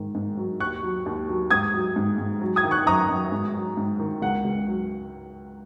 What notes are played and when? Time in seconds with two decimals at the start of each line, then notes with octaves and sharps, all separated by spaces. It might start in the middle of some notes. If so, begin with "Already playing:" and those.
Already playing: G#2 D#3
0.15 G#2
0.37 F#3
0.60 D#2 C#6 F#6
0.83 F#3
1.06 D#2
1.29 F#3
1.51 G#2 D#6 G#6
1.74 F#3
1.96 G#2
2.18 G#2
2.41 F#3
2.56 D#6 G#6
2.64 D#3
2.71 C#6 F#6
2.86 F#2 A#5 D#6
3.09 F#2
3.32 G#2
3.55 F#3
3.77 G#2
3.99 D#3
4.22 C#2 F#5
4.45 C#2
4.67 F#3